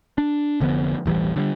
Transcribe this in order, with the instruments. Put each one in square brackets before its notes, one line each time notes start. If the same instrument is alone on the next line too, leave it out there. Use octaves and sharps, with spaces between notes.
[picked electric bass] D4
F1 D3 F3 B3
E1 A1 E3 G3
D3 F#3 G3